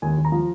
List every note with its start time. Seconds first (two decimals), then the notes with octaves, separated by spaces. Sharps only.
0.02 D#2 G#5
0.18 D#2
0.25 A#5
0.32 F3